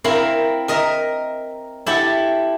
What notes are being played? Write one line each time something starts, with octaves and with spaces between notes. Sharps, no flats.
C4 E4 A#4 F5 B5
A#4 D#5 E5 A#5
E4 G4 A4 F#5